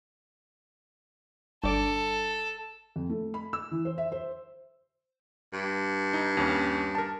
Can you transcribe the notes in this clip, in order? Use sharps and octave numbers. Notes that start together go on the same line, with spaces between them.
G1 A4 D5
F2
A3
B5
E6
E3
C5
E5
C5
G2
D#4
D#2 C#4
A#4 A5